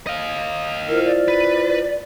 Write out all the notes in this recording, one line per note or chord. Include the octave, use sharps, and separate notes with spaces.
D#5 F5
E4 F4 A#4 C5
D5
B4